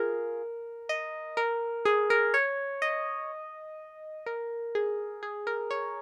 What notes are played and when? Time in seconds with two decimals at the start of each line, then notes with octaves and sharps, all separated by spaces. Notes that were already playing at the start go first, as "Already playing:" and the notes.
Already playing: F4 G#4 A#4
0.89 D#5
1.37 A#4
1.85 G#4
2.10 A#4
2.34 C#5
2.82 D#5
4.26 A#4
4.75 G#4
5.23 G#4
5.47 A#4
5.71 C#5